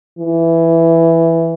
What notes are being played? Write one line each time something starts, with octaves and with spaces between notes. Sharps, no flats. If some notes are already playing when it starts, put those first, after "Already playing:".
E3